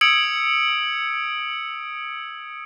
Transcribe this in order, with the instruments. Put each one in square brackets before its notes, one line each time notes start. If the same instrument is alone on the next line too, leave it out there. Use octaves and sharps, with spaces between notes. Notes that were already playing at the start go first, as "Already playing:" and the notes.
[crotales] D#6 E6 G#6 C#7 D7 F#7